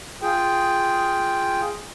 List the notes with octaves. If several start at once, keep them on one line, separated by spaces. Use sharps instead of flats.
F4 G#4 G5